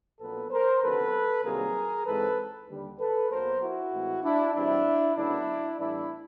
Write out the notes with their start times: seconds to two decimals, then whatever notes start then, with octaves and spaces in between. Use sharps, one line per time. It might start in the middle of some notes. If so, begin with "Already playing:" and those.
0.20 A#1 A#2 F#3 B3 A4 B4
0.50 A#4 C5
0.82 D2 C3 D#3 F#3 B3 A4 B4
1.44 C2 C3 D#3 F#3 A#3 G#4 A#4
2.06 G#2 E3 G#3 C4 A4 B4
2.68 D#2 D3 G3
2.99 A4 B4
3.29 B1 B2 F#3 A#3 A#4 C5
3.60 E4 F#4
3.93 A2 E3 G#3 C4
4.23 D4 E4
4.54 E2 B2 G3 C4 D4 E4
5.16 D2 C#3 F#3 B3 D4 E4
5.78 A2 E3 G3 B3 D4 E4